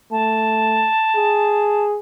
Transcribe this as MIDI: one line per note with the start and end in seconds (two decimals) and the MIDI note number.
0.11 0.89 57
0.11 1.84 81
1.16 1.99 68